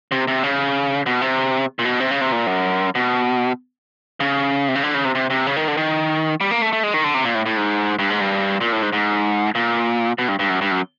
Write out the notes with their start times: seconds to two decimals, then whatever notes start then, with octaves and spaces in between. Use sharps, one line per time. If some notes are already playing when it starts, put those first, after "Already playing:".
0.12 C3
0.28 C3
0.43 C#3
1.06 B2
1.21 C3
1.79 A#2
1.85 B2
2.00 C3
2.11 C#3
2.21 C3
2.32 A#2
2.47 F#2
2.95 B2
4.20 C#3
4.68 C3
4.75 C#3
4.83 D3
4.94 C#3
5.05 C3
5.15 C3
5.30 C3
5.47 C#3
5.56 D#3
5.68 D3
5.77 D#3
6.41 G3
6.51 A#3
6.62 A3
6.73 A3
6.83 G#3
6.94 D#3
7.04 D3
7.14 C3
7.25 A#2
7.35 A2
7.46 A2
7.57 G#2
7.99 G2
8.10 G#2
8.20 G2
8.61 A#2
8.72 A2
8.82 G#2
8.93 G#2
9.55 A#2
10.18 B2
10.28 G2
10.39 G2
10.50 F#2
10.61 G2
10.71 F#2